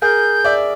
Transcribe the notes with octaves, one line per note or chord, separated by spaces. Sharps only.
G#4 A#4 G6
D5 E5